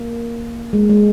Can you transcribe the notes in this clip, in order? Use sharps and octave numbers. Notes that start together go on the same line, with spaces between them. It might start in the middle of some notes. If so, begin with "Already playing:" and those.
Already playing: A#3
G#3
G#3